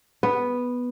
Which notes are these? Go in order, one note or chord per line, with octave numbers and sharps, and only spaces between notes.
B3